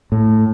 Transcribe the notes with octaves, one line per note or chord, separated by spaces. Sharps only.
A2